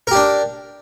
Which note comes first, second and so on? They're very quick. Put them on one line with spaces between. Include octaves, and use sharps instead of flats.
A#4 G4 D4